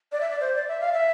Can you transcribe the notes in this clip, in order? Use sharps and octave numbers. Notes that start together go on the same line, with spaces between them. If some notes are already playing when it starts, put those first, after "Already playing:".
D5
E5
D5
C5
D5
E5
F5
E5